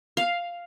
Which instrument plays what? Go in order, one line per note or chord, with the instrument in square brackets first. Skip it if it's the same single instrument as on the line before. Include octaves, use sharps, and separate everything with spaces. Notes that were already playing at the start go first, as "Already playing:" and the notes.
[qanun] F5